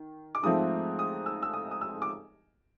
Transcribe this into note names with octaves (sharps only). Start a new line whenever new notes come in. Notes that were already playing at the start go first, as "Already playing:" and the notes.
Already playing: D#3
D6
G#2 F3 A3 C4 D#6
D#6
E6
E6
D#6
D#6
E6
D6